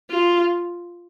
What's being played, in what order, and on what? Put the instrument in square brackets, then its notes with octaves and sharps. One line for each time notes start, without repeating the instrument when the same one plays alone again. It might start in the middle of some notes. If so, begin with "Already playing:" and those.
[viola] F4